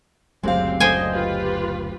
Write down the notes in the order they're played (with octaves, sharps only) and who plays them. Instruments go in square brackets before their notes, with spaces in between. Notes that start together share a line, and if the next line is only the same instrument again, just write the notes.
[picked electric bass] F#1 D2 F#3 [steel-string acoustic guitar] G#3 F5 [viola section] C4 G4
[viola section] D3 D#5 [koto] C5 G5 G#5
[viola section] F4 G4 B4